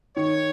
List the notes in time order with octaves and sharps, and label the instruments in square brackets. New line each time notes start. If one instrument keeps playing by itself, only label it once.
[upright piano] D#3 [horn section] C#5